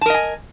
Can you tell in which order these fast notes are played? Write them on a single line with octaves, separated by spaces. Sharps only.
A5 A#4 D#5 G#5